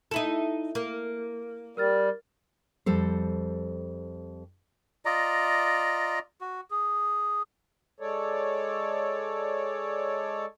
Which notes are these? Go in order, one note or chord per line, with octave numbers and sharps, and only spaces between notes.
D#4 E4 A4
A#3
G3 A#4 F6 A6
F2 G3 A4 C5
F4 D5 D#5 A#5
F#4
G#4
G#3 A4 C#5 D5